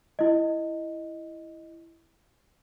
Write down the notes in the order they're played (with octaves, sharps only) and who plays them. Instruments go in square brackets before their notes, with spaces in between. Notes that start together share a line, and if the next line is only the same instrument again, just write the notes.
[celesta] E4 D#5